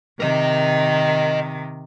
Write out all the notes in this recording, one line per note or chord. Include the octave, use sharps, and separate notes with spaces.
C3 D#3 A#4 D#5